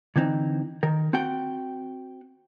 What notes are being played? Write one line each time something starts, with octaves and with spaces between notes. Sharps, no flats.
D3 E3 C4 D#4
D#3 A#4
C4 F#4 F#5 G5